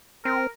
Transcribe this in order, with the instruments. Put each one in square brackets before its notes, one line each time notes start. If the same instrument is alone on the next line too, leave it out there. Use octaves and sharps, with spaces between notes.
[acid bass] C4 [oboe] A#4